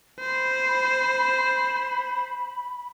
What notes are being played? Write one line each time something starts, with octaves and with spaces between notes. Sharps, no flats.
C5 B5